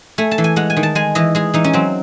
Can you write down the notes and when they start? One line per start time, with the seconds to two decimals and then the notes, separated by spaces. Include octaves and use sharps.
0.18 A3 G#5
0.31 A5
0.38 E3
0.44 G#5
0.56 G#3 F#5
0.70 G#5
0.76 D#3
0.83 A5
0.95 G#3 G#5
1.15 E3 D#5
1.35 G#3 G#4
1.54 E3 D#4
1.64 C#4
1.73 F#3 C4